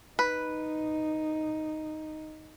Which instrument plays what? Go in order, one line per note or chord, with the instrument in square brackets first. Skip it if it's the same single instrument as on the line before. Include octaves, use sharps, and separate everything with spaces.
[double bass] D#4 [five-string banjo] B4